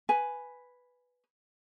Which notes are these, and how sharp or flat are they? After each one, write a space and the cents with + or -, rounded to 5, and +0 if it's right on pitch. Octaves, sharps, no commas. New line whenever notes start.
B4 +0 G#5 +0